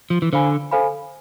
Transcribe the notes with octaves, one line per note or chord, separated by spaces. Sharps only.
F3
E3
D3 C5 F5 G#5 B5
A4 C5 F5 G#5 B5